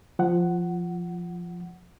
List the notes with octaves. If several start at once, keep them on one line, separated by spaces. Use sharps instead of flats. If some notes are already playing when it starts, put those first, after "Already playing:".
F3 F#5